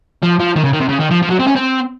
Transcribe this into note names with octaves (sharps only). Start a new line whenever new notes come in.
F3
F3
D#3
C#3
D#3
C3
C#3
D#3
F3
F3
F#3
C4
C#4
C4